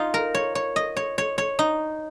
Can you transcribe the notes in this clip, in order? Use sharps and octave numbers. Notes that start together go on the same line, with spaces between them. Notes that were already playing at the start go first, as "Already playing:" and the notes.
Already playing: D#4 F4
A#4
C#5
C#5
D#5
C#5
C#5
C#5
D#4